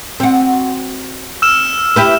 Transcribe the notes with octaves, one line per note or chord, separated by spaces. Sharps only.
C4 F#4
E6 F6 E7
E4 G4 B4